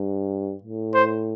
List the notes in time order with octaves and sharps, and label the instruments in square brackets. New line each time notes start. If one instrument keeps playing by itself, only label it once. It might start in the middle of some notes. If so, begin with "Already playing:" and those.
Already playing: [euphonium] G2
A2
[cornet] C5